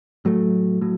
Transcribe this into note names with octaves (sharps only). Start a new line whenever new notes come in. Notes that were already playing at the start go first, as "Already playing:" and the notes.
A2 F#3 A3
A2 F#3